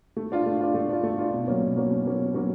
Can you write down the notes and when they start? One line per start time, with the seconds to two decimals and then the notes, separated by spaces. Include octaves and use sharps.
0.17 A3
0.32 D4 F4
0.46 A3
0.61 D4 F4
0.74 A3
0.89 D4 F4
1.03 A3
1.18 D4 F4
1.33 B2
1.48 F#3 A#3 C#4
1.61 B2
1.77 F#3 A#3 C#4
1.91 B2
2.05 F#3 A#3 C#4
2.19 B2
2.34 F#3 A#3 C#4